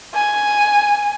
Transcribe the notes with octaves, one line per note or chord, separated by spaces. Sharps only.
G#5